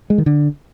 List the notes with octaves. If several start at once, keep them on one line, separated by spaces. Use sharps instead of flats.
G#3
D#3
D3